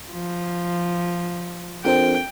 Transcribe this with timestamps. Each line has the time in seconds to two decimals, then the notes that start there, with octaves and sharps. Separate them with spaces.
0.11 F3
1.85 F2 D4 A#4 C5 G5